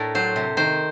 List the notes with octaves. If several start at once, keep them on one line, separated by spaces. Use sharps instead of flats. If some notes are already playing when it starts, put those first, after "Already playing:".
Already playing: A2 A3 D4 A#4
F#3 C5
C3
D#3 C5